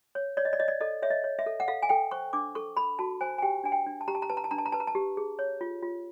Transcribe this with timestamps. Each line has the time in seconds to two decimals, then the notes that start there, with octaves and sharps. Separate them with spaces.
0.15 C#5
0.37 C#5 D5
0.45 D#5
0.53 D5
0.59 C#5 D#5
0.68 D5
0.81 A4 D#5
1.02 C#5 E5
1.10 D#5
1.24 C#5
1.39 E5
1.46 A4
1.60 F#5
1.68 A4 F5
1.83 G#5
1.89 A4 G5
2.11 C5 C#6
2.33 D4 D6
2.55 A4 C#6
2.77 A4 B5
2.99 F#4 A5
3.21 C5 G#5
3.38 G#5
3.42 G4 G5
3.64 D4 G#5
3.72 G5
3.86 D4
4.01 A5
4.08 G4 A#5
4.15 A5
4.22 A#5
4.30 B4 A5
4.37 A#5
4.44 A5
4.51 D4 A#5
4.58 A5
4.66 A#5
4.72 B4 A5
4.80 A#5
4.87 A5
4.95 G4
5.17 G#4
5.39 C#5
5.61 F4
5.83 F4